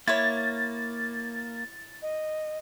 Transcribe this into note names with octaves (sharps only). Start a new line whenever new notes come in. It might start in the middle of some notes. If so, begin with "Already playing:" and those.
A#3 E4 C#5 A6
D#5